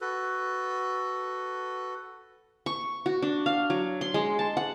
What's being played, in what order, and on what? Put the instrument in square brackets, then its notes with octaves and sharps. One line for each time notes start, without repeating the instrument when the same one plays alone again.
[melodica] F#4 A4 B4
[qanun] C#6
F#4
D4
F5
F#3
C6
G#3
A5
F#5